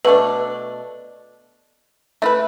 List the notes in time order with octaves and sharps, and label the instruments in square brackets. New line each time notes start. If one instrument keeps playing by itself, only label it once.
[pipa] B2 A3 D4 [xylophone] B4
[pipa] A3 E4 B4 [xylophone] E5